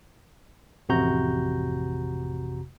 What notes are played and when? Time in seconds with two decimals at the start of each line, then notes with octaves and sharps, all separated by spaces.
0.89 A1 F2 C3 F#4 A#5 G6